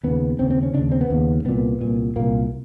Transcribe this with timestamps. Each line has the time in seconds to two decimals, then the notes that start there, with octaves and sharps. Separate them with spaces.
0.03 D#2 C#3 B3
0.39 D#2 C#3 C4
0.50 C4
0.63 C#4
0.74 C#3 D4
0.78 D#2
0.92 C4
1.01 B3
1.10 D#2 C#3
1.45 C2 A#2 B3
1.81 C2 A#2
2.16 C2 A#2 A#3